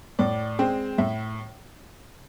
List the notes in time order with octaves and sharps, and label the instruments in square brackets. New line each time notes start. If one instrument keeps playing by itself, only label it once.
[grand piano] A2 D5
G#3 C4
A2 E5